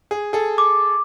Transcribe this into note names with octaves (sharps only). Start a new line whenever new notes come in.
G#4
G#4 A4
D6